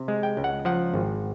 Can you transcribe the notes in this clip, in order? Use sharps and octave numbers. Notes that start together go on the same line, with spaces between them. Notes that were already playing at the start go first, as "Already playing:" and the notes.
Already playing: C3
G#3
G5
C#2
F#5
F3 F#5
G#1